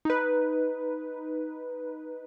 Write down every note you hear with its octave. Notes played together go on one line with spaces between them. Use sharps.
D#4 B4